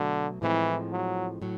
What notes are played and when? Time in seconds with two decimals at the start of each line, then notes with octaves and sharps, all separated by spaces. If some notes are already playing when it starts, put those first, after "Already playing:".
Already playing: B2 D3 F#3 A3
0.42 A2 E3 F3 G#3 C4
0.92 F#3
1.42 A2 F#3